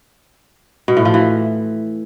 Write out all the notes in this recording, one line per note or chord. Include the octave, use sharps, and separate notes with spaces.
B2
A2
F3
E3